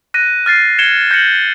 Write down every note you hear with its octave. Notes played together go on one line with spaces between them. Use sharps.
F#6 A#6 D#7
F6 A6 C7
G#6 C#7 E7 G7
G6 A#6 C#7 F#7